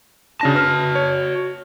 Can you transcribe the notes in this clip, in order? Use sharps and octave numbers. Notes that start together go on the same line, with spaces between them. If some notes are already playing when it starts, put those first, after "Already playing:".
C#3 D4 F#4 A5 A#6
B4 F6
C#5